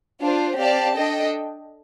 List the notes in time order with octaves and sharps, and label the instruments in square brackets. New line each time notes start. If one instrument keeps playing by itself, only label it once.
[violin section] D4 F4 C5
C4 G4 D5 F5 A5
D4 A4 D#5 G5